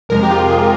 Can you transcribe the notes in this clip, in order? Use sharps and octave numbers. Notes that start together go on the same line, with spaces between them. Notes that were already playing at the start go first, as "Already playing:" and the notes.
F2 C3 F3 G#3 A#4
G4
F4
G4
G#4